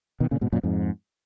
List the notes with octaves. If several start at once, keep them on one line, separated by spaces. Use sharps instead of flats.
B2 D#3
A#2 C#3
G#2 B2
F#2 A#2
F2 G#2